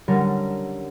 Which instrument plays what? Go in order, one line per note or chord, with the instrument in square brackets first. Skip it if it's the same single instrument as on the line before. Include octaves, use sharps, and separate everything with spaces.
[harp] D3 G3 C#4 A#4